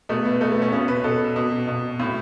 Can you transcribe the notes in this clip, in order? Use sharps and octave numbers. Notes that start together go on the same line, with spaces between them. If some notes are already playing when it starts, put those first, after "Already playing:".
B2 A3
B3
B2 A3
B3
C#4
B2 C#4
B4
B2 A4
B2
B2
A2